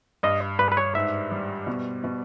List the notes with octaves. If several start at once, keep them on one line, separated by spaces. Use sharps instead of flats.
G2 D#5
G2 B4
B4
C#5
G#2 E5
G3
B2
B2